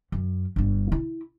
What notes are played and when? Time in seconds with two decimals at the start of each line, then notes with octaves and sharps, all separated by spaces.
0.12 F#2
0.56 G1 G2
0.92 E4